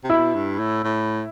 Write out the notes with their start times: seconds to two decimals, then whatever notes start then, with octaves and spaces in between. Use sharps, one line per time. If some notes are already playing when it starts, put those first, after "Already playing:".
0.04 C3
0.10 B2 E4
0.35 G2
0.59 A2
0.84 A2